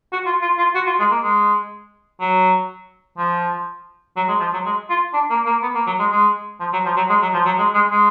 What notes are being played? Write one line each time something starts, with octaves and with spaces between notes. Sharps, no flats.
F#4
F4
F4
F4
F#4
F4
G#3
A#3
G#3
F#3
F3
F#3
G#3
F3
F#3
G#3
F4
D4
A#3
A#3
B3
A#3
F#3
G#3
G#3
F3
F#3
F3
F#3
G#3
F#3
F3
F#3
G#3
G#3
G#3